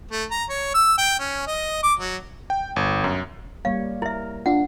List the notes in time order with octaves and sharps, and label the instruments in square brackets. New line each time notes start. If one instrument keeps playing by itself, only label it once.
[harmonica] A3
A#5
C#5
E6
G5
C#4
D#5
D6
F#3
[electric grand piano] G5
G1
F#2
[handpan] G3 A#3 C#5 [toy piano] F5
[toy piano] E4 E5 [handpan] A#4
[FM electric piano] D4 F4 [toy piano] F#5